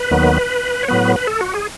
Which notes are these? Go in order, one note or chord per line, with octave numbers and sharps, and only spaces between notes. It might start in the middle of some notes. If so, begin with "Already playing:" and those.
Already playing: B4
D#2 D#3 F#3 B3
C#5
A2 F#3 B3 B4
B4
A4
F#4
G#4